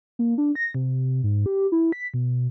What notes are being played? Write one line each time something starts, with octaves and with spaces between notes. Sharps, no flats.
A#3
D4
A#6
C3
G#2
G4
E4
B6
B2